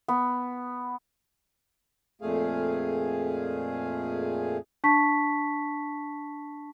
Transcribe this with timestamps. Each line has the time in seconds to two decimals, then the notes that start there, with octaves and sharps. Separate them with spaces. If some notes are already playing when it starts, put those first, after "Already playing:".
0.08 B3
2.21 F2 A#2 A3 G#4 F5
4.84 D4 A5 C#6 B6